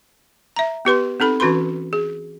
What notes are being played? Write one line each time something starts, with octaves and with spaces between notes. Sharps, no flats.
E5 A#5
B3 G4 B4 C6
C4 D#4 A4 B5
E3 C#4 F#4 B4 B5 C6
G#4